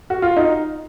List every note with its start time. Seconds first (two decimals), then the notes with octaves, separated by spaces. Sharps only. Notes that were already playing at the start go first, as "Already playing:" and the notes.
0.10 F#4
0.22 F4
0.37 D#4